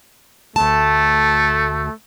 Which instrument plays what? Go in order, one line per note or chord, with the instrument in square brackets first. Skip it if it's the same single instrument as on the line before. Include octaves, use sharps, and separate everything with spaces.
[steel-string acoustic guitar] D2 A5 [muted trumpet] A3